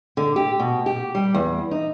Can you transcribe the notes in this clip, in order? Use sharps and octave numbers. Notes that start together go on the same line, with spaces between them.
D3
G4
B2
G4
G3
E2
D#4